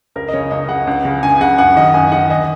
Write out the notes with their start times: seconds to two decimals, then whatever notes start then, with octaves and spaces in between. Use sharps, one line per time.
0.16 C#2 A#4
0.28 D#5
0.33 C#3 C#5
0.51 C#2 D#5
0.69 C#3 F#5
0.87 C#2
1.05 C#3
1.22 C#2 G#5
1.41 C#3 F#5
1.58 F#2 F#5
1.76 D#3 D#5
1.94 F#2 G#5
2.12 D#3 F#5
2.30 D#2 D#5